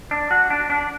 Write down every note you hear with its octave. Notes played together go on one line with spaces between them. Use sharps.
D4
F#4
D4
D4